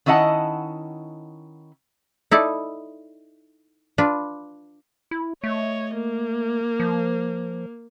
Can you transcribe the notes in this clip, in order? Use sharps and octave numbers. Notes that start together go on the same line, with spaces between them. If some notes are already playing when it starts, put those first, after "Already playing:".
D#3 C#4 E4 D#5 F#5 A5
D#4 E4 A4 D5
D4 F4 B4
E4
A3 C#5 D#5
A#3
F3